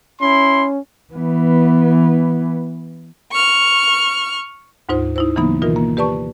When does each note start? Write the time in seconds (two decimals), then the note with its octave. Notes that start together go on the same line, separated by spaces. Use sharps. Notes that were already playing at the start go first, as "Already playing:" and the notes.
0.21 C#4 E4 C6
1.14 E3 B3
3.32 C#6 F6
4.89 D2 G#2 D#4 F4 C5
5.16 D#4 E4 C5
5.36 C#3 E3 F#3 A#3 B3 D#4
5.62 B2 D#3 E3 F4 A#4
5.76 A#3
5.97 G4 B4 D5 A5 C#6